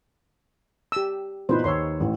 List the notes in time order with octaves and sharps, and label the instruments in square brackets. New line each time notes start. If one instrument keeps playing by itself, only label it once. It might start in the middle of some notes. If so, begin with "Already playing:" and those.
[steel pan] G4 E6
[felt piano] A#2 E3 B3 [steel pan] D#4 B4 C5
[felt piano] D#2 E6 [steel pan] C#5 C6
[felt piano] A1